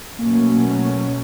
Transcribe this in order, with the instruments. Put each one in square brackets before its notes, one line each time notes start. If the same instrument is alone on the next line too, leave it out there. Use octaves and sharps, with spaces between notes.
[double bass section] B2 F#3 A3 C#4 [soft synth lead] A#3